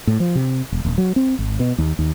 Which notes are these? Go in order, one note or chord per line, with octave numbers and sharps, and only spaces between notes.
A2
F3
C3
E1
D#1
F#3
C4
G#1
B2
D#2
D#2